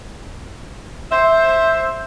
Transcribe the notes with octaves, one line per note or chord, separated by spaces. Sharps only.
C5 E5